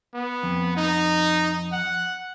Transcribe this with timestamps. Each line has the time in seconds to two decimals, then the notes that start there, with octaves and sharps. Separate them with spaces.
0.14 B3
0.43 F2
0.77 D#4
1.72 F#5